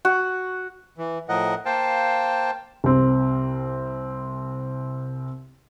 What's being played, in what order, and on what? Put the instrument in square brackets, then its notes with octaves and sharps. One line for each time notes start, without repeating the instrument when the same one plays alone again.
[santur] F#4
[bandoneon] E3
A2 F3 A#4 D#5 F#5
A#3 C5 F5 G5 A5
[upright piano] C2 C4